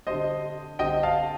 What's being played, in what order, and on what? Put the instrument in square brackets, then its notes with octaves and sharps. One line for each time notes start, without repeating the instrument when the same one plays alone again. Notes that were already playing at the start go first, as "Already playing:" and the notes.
[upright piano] D3 G3 C4 [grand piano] C5 D#5
[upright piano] D3 G3 C4 [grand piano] D#5 G5
[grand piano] F5 A5